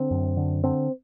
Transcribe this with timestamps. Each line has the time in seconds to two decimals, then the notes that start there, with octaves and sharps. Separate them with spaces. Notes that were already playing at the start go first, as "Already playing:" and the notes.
Already playing: D3 C4
0.11 F#2
0.37 D3
0.64 D3 C4